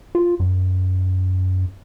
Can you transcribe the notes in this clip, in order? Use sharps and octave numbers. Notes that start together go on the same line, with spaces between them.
F4
F#2